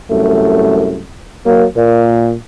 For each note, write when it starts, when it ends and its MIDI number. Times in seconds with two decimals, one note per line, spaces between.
0.11 1.03 36
0.11 1.03 42
0.11 1.03 57
1.46 1.65 54
1.46 1.65 58
1.77 2.34 46